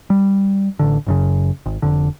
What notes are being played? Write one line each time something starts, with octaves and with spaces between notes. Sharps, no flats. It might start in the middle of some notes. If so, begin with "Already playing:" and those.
G3
A1 D3
F#1 F#2 C#3
G#1
F1 D3